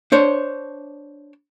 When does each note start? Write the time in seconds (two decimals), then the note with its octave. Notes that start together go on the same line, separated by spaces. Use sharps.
0.12 D4 C5 C#5